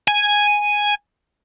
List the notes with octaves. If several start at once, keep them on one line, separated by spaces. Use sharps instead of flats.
G#5